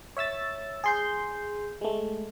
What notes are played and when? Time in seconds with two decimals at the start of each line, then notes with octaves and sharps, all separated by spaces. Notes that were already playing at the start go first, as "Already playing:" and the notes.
0.17 C#5 E5 E6 A6
0.84 G#4 C6 G6
1.81 G#3 A3